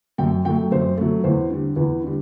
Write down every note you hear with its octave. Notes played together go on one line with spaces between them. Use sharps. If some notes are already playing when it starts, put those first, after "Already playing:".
F#2 G5
F#3 A3 G5
F#2 C5
F#3 A3
E2 C5
D3 G3
E2 B4
D3 G3